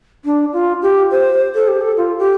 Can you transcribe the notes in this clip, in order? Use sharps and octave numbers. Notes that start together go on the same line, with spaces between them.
D4
F4
G4
C5
A4
G4
A4
F4
G4